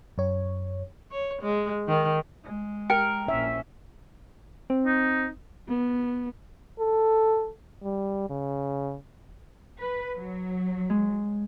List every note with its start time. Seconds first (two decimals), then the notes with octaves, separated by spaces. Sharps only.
0.18 F#2 C#5
1.11 C#5
1.42 G#3
1.87 D#3
2.44 G#3
2.90 A#4 G5
3.28 A#1 C#4 E5
4.70 C4
4.86 D#4
5.68 B3
6.80 A4
7.83 G3
8.30 C#3
9.79 B4
10.17 F#3
10.90 G#3